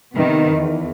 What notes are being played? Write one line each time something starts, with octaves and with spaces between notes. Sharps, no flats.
C3 D#3 B3
E2